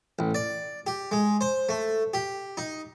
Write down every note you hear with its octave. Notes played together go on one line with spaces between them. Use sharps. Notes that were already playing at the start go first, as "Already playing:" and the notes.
A1
D5
G4
G#3
C5
A3
G4
D#4